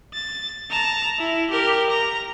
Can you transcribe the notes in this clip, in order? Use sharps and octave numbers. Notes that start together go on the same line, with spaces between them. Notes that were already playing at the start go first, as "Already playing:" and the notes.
A6
A5 A#5
E4
G4 A#4
A#5